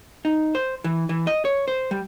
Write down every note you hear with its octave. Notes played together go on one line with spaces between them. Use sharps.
D#4
C5
E3
E3
D#5
C#5
C5
G3